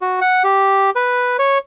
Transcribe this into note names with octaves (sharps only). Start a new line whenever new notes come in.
F#4
F#5
G4
B4
C#5